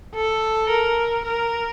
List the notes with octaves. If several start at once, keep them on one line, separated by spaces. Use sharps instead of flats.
A4
A#4
A#4